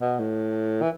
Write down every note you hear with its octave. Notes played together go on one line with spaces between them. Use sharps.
B2
A2
E3